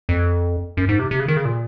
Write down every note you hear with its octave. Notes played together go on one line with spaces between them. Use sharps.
F2
F#2
G#2
C3
C3
C#3
D#3
C#3
A#2